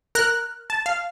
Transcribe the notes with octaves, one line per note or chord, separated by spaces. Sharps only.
A#4 F6 F#6
A5
F5